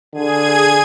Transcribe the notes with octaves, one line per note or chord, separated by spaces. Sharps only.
D3 G#4 G#6 D#7